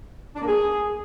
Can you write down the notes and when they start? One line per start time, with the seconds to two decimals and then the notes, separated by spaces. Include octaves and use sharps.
0.36 D4
0.41 A#3
0.47 G#4